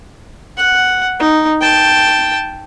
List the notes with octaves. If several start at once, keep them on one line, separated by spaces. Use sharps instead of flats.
F#5
D#4
G5 A5